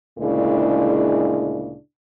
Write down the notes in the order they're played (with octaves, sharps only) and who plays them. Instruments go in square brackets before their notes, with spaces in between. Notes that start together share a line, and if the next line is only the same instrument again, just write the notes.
[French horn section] D2 A#2 C#3 G#3 D4 E4